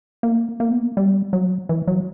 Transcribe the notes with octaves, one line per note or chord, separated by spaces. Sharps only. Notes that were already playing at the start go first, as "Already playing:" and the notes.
A#3
A#3
B3
A#3
G3
F#3
E3
F#3